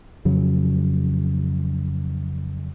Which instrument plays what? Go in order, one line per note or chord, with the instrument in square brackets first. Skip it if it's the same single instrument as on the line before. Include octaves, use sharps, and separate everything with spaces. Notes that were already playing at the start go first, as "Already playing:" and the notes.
[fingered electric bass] F2 C#3 F#3